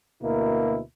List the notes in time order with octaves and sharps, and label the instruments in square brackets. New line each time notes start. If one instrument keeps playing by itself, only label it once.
[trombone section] D2 B2 A#3 E4 A#4